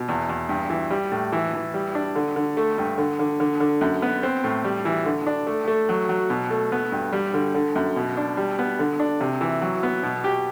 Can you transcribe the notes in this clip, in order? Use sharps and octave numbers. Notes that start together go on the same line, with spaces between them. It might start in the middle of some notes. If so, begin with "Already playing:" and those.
Already playing: B2
E2
E2
G2
E3
G3
A2
E3
E3
G3
D4
D3
D3
A3
G2
D3
D3
D3
D3
F#2
B3
C4
A2
G3
E3
D3
D4
A3
A3
F#3
F#3
B2
A3
B3
G2
G3
D3
D3
F#2
B2
D4
G3
B3
D3
D4
C3
E3
F#3
B3
B2
G4